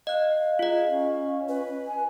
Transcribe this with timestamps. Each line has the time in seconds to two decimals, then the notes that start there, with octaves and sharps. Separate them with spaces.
0.07 D#5 F5 F#6
0.59 F4 G#4 D#5
0.89 C#4
1.48 B4
1.87 G#5